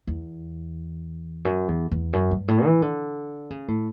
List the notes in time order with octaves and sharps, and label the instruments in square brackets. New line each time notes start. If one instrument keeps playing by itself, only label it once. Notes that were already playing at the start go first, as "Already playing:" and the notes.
[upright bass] E2
F#2
E2
E2
F#2
G2
A2
E3
D3
C#3
A2